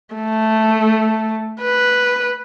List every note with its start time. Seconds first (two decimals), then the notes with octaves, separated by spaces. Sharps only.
0.15 A3
1.62 B4